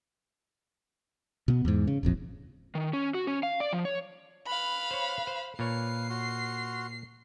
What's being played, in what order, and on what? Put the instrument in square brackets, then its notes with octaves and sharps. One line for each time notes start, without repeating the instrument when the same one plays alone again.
[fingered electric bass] B2 B3
E2 G#2
C#3
D#1 A1 F2
[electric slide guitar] D#3
C#4
F#4
C#4
F5
D5
F3
C#5
[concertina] B4 [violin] F5 B5
[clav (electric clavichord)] C5 C#5
C5
[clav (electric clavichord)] A#2 C#5 [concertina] B4 F5 [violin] C7
[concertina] F#4 C6 F6